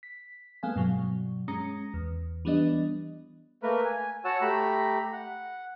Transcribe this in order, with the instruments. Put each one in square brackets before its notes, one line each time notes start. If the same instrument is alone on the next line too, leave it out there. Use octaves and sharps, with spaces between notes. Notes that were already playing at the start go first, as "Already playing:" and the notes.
[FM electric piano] B6
G#3 A#3 B3 A4 F5 G#5
G2 B2 F#3
G#3 C#4 A#5 D#6 A#6 C#7
E2
E3 G3 B3 D4 D#5
[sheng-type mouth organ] A3 A#3 A#4 B4
G#5
F#4 C#5 F#5 A5 E6
A3 G4 A#5 B5
F#5